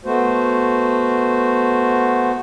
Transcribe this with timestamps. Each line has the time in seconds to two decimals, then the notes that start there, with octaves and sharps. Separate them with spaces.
0.05 A3 B3 F#4 C5